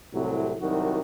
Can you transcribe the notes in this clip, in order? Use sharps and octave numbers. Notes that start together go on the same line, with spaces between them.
C2 A2 C3 F#3
C2 D#3 F#3 F#4